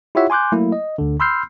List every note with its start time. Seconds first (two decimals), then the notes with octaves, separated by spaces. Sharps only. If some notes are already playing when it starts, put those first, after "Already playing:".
0.15 E4 F4 G4 C#5 E5 F#5
0.30 G#5 C6 D6 F#6 G6
0.52 F#3 A3 A#3 E4
0.72 D#5
0.98 D2 D3
1.20 B5 C6 E6 F6 G6 C7